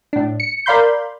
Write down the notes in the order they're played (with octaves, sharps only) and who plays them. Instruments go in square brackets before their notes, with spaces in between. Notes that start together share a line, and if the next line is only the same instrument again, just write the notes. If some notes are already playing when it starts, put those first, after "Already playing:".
[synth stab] A2 D4
C#7
A#4 D5 F5 B5 C6 G6